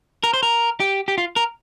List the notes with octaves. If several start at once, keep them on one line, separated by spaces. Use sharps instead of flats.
A#4
C5
A#4
G4
G4
F4
A#4